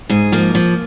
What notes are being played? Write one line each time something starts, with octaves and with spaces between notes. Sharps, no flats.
G#2 G#4
F3 A#3
F3